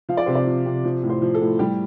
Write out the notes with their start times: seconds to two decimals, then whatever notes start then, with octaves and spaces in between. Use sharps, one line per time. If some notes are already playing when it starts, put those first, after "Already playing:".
0.09 F3 F5
0.17 D5
0.26 C3 C5
0.35 D5
0.46 F3
0.66 C3
0.85 F3
1.03 A2
1.10 C5
1.22 F3
1.34 A4
1.41 A2
1.59 G3 G4